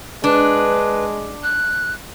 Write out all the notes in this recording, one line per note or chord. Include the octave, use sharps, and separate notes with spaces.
G#3 D4 B4
F#6